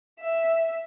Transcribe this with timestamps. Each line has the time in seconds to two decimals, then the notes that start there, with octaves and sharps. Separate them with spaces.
0.20 E5